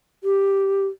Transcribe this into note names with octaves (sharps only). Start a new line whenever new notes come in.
G4